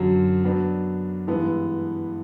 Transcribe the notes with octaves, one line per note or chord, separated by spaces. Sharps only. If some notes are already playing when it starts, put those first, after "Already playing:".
Already playing: F#2 D3 F#3
F#3 B3 D4
G2 E3 G#3 B3 E4